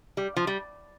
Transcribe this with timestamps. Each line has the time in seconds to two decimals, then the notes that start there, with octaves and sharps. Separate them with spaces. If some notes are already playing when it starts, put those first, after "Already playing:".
0.17 G3
0.36 F3
0.47 G3